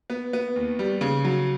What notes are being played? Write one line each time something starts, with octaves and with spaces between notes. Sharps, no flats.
B3
B3
D#2
G3
C#3
F#3